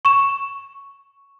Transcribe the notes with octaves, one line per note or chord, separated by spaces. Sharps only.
C#6 E7